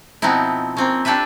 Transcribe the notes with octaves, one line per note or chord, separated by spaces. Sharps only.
B2 F3 B3 C4 D#4 E4
A#3 C4 C#4
D4 G4 A4 B4 E5